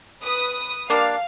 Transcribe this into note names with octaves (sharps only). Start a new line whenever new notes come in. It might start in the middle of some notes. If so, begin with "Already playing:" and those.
B4 D#6
G3 A#3 D4 F5